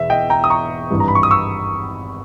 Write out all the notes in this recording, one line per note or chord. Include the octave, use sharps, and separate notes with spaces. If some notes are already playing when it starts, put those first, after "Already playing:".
Already playing: E1 E2 E5
D#5 G5
G5 A#5
D#6
A#5 C#6
G#1 G2 E3 G3
A#5
B5
C#6
D#6
C#6 E6